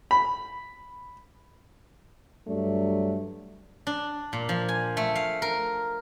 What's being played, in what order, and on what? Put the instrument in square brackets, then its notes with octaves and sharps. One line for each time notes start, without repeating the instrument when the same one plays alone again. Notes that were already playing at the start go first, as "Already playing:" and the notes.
[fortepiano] B5
[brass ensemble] G2 F#3 A3 D4
[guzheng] D4
A#2
F3
G#5
A3
F5
A#4